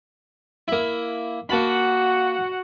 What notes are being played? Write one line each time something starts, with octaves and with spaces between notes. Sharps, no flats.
A#3 E4
A#3 F#4 F#5 A5 B5